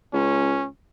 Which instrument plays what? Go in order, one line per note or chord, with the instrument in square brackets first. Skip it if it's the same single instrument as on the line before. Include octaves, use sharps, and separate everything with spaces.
[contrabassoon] C#2 [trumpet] C#4